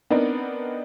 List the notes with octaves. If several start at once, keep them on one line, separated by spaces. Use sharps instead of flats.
B3 C4 D4 D#4 A#4